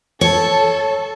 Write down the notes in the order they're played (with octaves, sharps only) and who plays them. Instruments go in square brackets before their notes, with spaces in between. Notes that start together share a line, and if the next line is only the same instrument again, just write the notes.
[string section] A4 [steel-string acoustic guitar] C#5